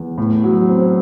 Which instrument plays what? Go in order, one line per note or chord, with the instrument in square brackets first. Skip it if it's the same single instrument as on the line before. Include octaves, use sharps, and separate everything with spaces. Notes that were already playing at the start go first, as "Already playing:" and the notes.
Already playing: [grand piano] E2
A2
F#3
C4